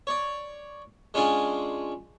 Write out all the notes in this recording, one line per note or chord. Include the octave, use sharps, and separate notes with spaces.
C#5 D5
G#3 C#4 D4 F4 G#4